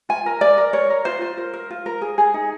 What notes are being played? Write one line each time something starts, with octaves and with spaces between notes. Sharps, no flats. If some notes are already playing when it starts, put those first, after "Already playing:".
F4 G#5
A#4
A#4 D5
A#4
A#4 C#5
A#4
F4 C5
F4
A#4
A#4
F4
A#4
G#4
G#4
D#4